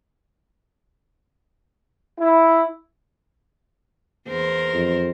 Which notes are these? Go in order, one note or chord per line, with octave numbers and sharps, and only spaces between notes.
E4
E2 A#4 C5
F2